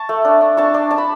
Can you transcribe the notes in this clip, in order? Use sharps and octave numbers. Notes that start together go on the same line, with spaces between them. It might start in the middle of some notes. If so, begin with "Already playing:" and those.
Already playing: A5 C#6
A3
D4
D4
D4 A5 C#6
D4
D4 A5
B5